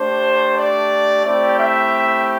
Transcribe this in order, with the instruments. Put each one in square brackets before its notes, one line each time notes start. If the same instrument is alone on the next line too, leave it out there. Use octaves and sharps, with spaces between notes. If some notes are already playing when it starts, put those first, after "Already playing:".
Already playing: [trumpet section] A3 D4 G4 C5
D5
A3 C4 E4 G4 D5
E5